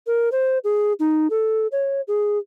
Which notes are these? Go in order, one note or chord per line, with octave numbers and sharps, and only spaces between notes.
A#4
C5
G#4
D#4
A4
C#5
G#4